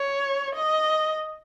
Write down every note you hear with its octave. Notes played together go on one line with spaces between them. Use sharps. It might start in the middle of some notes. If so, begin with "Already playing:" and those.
Already playing: C#5
D#5